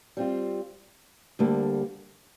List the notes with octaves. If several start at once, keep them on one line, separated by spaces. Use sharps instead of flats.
G3 C4 F4
D2 D3 G3 A#3